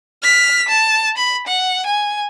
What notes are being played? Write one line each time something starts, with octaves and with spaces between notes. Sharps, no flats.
F6 B6
A5
B5
F#5
G#5